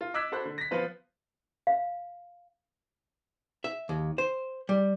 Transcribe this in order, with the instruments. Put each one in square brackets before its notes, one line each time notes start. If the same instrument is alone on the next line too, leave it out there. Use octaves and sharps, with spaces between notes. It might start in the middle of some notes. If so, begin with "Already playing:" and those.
[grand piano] F4
D#5 D6 E6 F#6 G#6 B6
F#4 A4 C5 B5 F#6
D3
A#6 B6
F3 B3 F4 B4 C5
[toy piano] F5
[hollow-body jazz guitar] E5
D#2
C5
G3